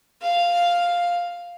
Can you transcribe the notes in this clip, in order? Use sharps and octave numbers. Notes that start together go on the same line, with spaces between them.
F5